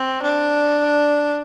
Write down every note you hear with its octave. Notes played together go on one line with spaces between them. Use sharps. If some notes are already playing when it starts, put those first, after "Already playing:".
Already playing: C4
D4